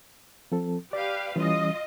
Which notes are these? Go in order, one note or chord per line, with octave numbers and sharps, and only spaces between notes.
F3 C4 A4
G4 B4 D5 F5
E3 G3 C#4 F4 D#5